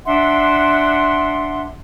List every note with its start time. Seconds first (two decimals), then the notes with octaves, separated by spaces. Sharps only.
0.05 D4 E5 F#5 C6